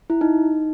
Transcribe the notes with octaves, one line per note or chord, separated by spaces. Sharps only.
E4
D#4